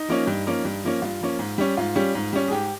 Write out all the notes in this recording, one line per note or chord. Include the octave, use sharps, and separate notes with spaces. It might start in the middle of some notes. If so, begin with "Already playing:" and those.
Already playing: D#4
F3 A#3 C#4
G2
F3 A#3 C#4
G2
F3 A#3 C#4
G2 F4
F3 A#3 C#4
G#2
G3 C#4
G#2 F4
G3 C#4
G#2
G3 C#4
G#4
G#2 G4